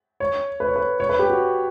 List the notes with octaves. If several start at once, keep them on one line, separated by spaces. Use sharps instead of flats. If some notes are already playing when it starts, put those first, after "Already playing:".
C#5
B4
C#5
B4
C#5
B4
G4
F#4